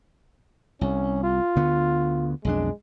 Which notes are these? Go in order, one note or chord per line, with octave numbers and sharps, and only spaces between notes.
C2 C#4
F4
D2 D3 B3
B1 F2 G#3 D4